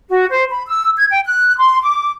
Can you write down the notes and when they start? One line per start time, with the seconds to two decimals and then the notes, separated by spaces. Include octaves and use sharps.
0.10 F#4
0.30 C5
0.50 B5
0.66 E6
0.96 G#6
1.10 G5
1.25 F#6
1.58 C6
1.82 D6